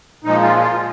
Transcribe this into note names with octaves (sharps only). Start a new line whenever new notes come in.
A#2 F3 G#3 D#4
F4
F4